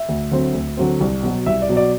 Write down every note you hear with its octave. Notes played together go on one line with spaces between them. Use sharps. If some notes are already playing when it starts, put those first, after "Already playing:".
Already playing: E5
D2
D3 F#3 C4
D2
D3 F#3 C4
C2
B2 F#3
C2 E5
D5
B2 F#3
D5